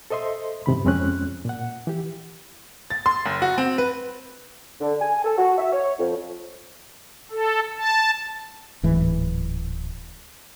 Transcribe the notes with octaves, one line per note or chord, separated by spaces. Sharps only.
A4 C5 D#5 E5 C6
G2 C3 D#3 B5
F2 G#3 C4 C#4 F#6
A#2 F#5
E3 G4
A6
C6
F#1
F#4
C4
B4
D3
G#5
A4
F#4
E5
C#5
F2
A4
A5
D1 G#2 E3